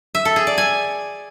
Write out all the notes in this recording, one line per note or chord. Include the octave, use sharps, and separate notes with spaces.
E5
A4
G#4
D5
G#5